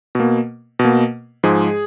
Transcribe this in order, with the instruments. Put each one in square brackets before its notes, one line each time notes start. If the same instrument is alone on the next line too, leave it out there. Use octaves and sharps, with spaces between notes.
[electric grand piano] B2 A#3
B2
A#3
G#2 F3 G#3 G#4